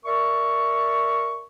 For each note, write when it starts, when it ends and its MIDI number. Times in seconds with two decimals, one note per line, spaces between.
0.05 1.44 70
0.05 1.44 74
0.05 1.44 76
0.05 1.44 85